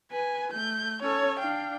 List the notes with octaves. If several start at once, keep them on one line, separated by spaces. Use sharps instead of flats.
B4 G#5
A3 G6
C#4 A4 C#5
D4 F5 G5